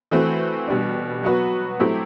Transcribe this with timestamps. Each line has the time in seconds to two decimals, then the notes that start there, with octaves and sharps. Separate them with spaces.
0.11 E3 A3 C4 F#4 B4
0.67 B2 G3 D4
1.23 F#3 B3 F#4 B4
1.79 F#3 A3 C4 E4 G4